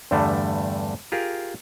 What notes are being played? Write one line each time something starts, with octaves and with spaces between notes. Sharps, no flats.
E2 G2 D3 G3 A3
F4 G4 G#4 A#4 F5